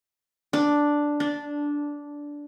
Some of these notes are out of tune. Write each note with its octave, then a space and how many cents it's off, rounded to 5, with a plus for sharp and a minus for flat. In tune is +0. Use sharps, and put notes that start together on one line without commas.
D4 +0
D4 -10